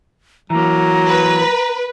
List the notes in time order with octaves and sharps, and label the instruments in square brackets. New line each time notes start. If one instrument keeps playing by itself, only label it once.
[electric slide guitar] E3 A#3 [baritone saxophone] F#3 [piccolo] A#5
[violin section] B4